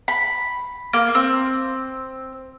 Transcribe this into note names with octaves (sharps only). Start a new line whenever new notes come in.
B5
A#3
C4